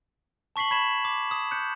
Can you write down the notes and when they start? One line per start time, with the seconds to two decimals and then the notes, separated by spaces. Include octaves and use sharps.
0.56 A5 C#6 B6 C7 F#7
0.71 B5 G#6 B6 E7 F#7
1.05 D6
1.30 D#6 E7
1.51 F#6 G6 C#7